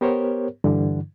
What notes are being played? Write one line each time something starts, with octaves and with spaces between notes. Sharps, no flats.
B3 G4 A#4 C5 C#5
G2 D3 E3